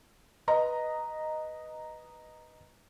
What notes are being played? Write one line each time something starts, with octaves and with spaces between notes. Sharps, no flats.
B4 D#5 A#5